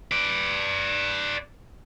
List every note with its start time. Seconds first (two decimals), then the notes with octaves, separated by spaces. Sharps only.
0.12 B4 D5